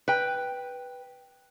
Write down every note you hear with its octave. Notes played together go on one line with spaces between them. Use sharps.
B4 G5